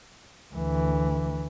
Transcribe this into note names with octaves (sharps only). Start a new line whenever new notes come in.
D2 E3